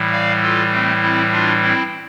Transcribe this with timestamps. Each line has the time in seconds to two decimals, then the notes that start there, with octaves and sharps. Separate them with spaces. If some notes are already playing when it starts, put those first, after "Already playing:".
Already playing: A2 E3 G3
0.11 D5 F5
0.42 F4 A4
0.71 A3 C4
1.01 C4 E4
1.32 D4 F4
1.62 C4 E4